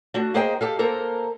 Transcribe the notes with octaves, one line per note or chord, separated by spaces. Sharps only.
A3 D4 F#4
A#3 D#4 G#4 C5 D#5 G5
G4 A4 F5
A#3 A4 A#4 C5